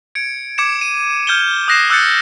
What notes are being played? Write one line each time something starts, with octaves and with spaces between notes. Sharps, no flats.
G#6 C#7 D7
D6 G#6 C#7 E7
D#7
F6 G6 G#6 D#7 E7 G7
D#6 F#6 A#6 C7 E7
D6 E6 F#6 G6 A6 C#7